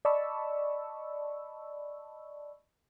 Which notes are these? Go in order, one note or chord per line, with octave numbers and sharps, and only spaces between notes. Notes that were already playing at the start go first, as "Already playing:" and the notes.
D5 D#5 A5 B5 C#6 E6